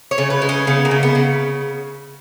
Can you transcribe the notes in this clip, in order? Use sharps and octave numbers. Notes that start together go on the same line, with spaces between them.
C#5
C#3
B4
G#3
C#4
C#3 B3
A#3
C#3
B3
C#3